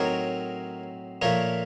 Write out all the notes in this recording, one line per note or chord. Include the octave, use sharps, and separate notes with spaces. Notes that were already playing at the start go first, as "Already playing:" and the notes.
Already playing: A2 F#3 C4 D#4 A#4 C#5
A#2 F3 A3 A#4 C#5